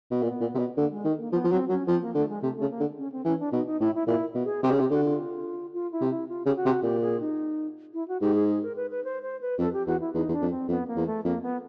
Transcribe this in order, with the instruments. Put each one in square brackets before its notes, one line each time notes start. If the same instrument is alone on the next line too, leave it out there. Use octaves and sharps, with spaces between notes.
[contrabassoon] B2
[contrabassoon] A#2 [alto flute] B3
[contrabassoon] A#2
C3
B2
[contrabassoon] D3 [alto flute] A#3
[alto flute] G#3
[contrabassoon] D#3
[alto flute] A#3
[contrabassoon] F3 [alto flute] B3
[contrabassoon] F3
[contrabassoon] F#3 [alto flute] C4
[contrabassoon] F#3 [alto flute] C#4
[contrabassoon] F3 [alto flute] C4
[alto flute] A#3
[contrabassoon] D3 [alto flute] A3
[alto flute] G#3
[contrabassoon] C3 [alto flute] A3
[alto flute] A3
[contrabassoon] C#3
[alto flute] A#3
[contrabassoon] D3
[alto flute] C#4
C4
[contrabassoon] E3 [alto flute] C#4
[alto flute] D4
[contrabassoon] B2 [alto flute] D#4
[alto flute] D#4
[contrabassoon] A2 [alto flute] E4
[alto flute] E4
[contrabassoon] A#2 [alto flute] E4
[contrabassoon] B2
[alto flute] G#4
[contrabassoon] C3 [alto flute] G4
[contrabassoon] C#3
[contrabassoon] C3 [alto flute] G4
[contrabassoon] D3 [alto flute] F#4
[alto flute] F4
F4
E4
[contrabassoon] C3
[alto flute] E4
F4
[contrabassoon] C#3 [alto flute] G4
[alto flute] F#4
[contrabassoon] C3
[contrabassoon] A#2 [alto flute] G4
[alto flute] G#4
D#4
E4
F#4
[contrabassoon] G#2 [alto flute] G4
[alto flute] G#4
G#4
A#4
B4
B4
C5
C5
B4
[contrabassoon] F2 [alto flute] A4
[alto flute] G4
[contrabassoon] E2 [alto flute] F#4
[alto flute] E4
[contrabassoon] E2 [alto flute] D#4
[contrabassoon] E2
[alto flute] D4
[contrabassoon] F2
[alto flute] C4
[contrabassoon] F2 [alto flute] B3
[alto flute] A#3
[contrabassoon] E2
[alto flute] A3
[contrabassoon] F2 [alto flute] A#3
[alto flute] B3